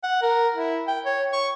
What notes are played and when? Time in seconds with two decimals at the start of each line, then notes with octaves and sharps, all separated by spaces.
0.03 F#5
0.22 A#4
0.55 E4
0.88 G5
1.05 C#5
1.33 C#6